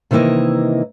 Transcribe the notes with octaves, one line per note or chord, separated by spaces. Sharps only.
C3 D#3 E3 A#3 E4 D#5